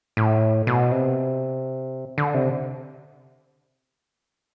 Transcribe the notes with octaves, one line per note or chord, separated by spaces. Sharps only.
A2
B2
C3
D3
C3